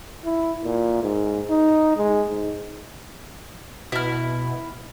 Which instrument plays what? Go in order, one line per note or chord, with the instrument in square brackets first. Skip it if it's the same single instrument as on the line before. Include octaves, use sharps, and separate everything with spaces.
[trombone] E4
A#2
G#2
D#4
G#3
G#2
[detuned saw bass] B2 [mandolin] E4 F6